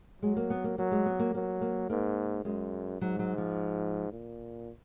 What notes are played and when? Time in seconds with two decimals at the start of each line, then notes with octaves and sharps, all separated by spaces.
0.22 F#3 G#3
0.36 A#3
0.50 B3
0.64 A#3
0.78 F#3 A#3
0.92 G#3
1.06 B3
1.19 A#3
1.34 F#3 A#3
1.61 A#3
1.89 G#2 A#3
2.45 F#2 G#3
3.01 G#2 F#3
3.19 F#3
3.38 F3
4.12 A#2